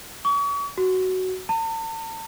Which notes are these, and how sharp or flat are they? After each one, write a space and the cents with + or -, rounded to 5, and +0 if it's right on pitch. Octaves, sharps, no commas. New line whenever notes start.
C#6 +40
F#4 +10
A5 +45